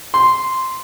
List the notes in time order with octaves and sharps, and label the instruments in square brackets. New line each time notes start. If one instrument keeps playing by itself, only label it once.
[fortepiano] C6